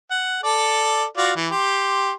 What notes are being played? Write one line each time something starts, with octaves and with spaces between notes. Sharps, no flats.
F#5
A4 D5
F4 F#4 D5
E3
G4 C6